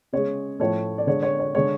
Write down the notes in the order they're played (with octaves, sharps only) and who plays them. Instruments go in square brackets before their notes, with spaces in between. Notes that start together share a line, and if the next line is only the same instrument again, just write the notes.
[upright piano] C#3 G#3 C#5
A2 F3 A3 C#5
D5
D3 G#3 C#5
C#5
C#5
D3 G#3 C#5